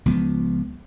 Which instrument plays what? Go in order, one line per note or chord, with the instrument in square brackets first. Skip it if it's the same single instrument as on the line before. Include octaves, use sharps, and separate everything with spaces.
[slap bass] C#2 F3 B3